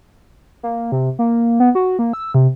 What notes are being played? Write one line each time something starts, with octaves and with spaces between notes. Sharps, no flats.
A#3
C3
A#3
B3
F#4
A#3
E6
C3